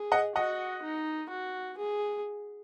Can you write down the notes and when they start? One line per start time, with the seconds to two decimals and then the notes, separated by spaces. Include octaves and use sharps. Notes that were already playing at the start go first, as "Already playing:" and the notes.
Already playing: G#4
0.12 D#5 F#5
0.36 F#4 D#5 F#5
0.83 D#4
1.30 F#4
1.77 G#4